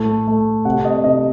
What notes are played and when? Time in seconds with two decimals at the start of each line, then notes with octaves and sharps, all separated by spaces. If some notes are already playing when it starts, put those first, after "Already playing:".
Already playing: A2 A3
0.27 A3
0.65 C3 F#5
0.85 D#5
1.04 C3 D#5